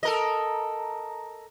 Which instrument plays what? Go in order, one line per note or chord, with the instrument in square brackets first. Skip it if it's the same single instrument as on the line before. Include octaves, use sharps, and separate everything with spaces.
[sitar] A4 A#4 D#5